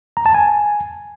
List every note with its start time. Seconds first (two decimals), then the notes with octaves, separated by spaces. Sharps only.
0.17 A#5
0.26 A5
0.34 G#5